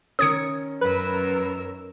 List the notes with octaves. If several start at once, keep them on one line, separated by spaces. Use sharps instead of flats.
D#3 C#4 D#6 G#6 C#7
F#2 A#4 B4 E6